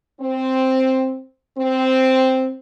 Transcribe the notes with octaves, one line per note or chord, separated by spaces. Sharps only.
C4
C4